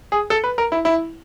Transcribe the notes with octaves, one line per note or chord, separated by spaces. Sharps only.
G#4
A4
B4
A#4
E4
E4